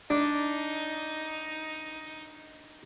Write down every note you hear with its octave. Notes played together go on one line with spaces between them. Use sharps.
D4 D#4